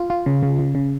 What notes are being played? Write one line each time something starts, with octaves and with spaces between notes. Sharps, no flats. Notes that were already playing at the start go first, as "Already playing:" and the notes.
Already playing: F4
F4
C#3
C#3
C#3
C#3